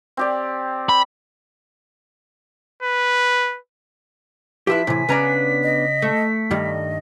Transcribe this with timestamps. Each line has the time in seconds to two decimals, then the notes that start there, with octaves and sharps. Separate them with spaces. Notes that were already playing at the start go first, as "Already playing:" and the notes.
0.17 C4 G4 D5
0.89 B5
2.83 B4
4.67 F3 E4 G4 B4 E5 B6
4.87 A2 C3 E3 G#5
5.09 C#3 B3 C#4 D4 A#5
5.63 D#5
6.02 A3
6.51 G2 D#3 G3 D#5